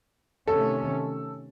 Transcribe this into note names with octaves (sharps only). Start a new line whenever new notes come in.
C3 D#3 A3 C#4 A4